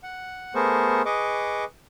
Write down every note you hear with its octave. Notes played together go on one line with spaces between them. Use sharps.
F#5
A3 B3 G#4 A#4 C5 C#6
G#4 B4 D#5 C#6 D6